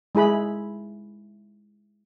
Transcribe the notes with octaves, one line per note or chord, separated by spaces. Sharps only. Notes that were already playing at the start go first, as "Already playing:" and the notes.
G#3 E4 G#4 B5